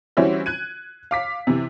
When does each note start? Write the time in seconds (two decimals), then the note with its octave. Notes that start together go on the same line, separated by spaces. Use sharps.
0.17 E3 G3 C4 C#4 E4 F#4
0.46 F#6 G#6 D#7
1.11 F5 D6 B6
1.47 C3 E3